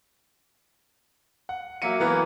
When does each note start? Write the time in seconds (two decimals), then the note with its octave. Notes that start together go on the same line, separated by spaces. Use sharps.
1.49 F#5
1.82 F#3 A#3 E5 C#7 D#7
2.00 E3 A#3 B3 A#4 B4